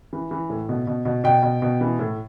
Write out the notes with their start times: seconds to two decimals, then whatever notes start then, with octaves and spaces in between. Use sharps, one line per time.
0.13 E3
0.31 E3
0.50 A2
0.69 B2
0.87 B2
1.05 B2
1.24 B2 G5
1.43 B2
1.62 B2
1.81 E3
1.99 A2